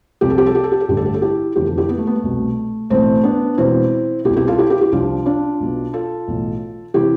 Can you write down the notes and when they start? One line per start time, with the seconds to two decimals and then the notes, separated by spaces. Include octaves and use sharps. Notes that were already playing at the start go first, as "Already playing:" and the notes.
0.21 C2 C3 F3 G4
0.30 A4
0.38 G4
0.46 A4
0.55 G4
0.64 A4
0.72 G4
0.80 A4
0.88 A1 G2 D3 G4
0.97 A4
1.05 G4
1.14 A4
1.22 E4 G4
1.56 F1 E2 D3 F3 G4
1.66 A4
1.78 E4 G4
1.89 B3
1.98 A3
2.07 B3
2.15 A3
2.23 C2 B2
2.90 B1 A2 E3 A3 C4
3.24 B3 D4
3.58 E1 E2 B2 C4 E4
4.25 B2 E4 G4
4.30 C2
4.36 E4 G4
4.48 F4 A4
4.58 E4 G4
4.70 E4 G4
4.81 E4 G4
4.92 C2 C3 F3 D4 F4
5.26 D4 F4
5.60 B1 B2
5.93 F4 A4
6.27 B1 A2 E3
6.94 C3 E3 E4 G4